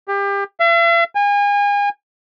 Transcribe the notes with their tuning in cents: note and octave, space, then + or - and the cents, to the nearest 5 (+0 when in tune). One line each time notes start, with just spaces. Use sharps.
G4 +30
E5 +45
G#5 -35